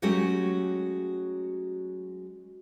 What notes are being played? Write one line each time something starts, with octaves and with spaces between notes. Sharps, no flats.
F#3 G#3 A3 C#4 F#4 G4